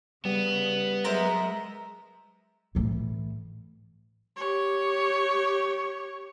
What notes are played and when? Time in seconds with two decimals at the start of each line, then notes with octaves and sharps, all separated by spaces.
0.25 C#3 G3 B3
1.04 F#3 G#3 A#4 C5 E5 A#5
2.75 A2 E3
4.36 G4 C#5